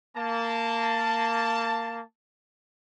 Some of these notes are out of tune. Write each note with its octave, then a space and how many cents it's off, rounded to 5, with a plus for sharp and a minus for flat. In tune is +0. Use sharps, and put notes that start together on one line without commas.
A#3 -15 A5 +10